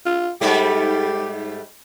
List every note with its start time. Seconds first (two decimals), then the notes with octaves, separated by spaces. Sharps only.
0.06 F4
0.41 G#2 G3 A3 G4